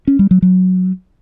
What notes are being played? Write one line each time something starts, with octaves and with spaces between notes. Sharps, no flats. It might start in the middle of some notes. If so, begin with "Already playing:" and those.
C#4
G3
F#3
F#3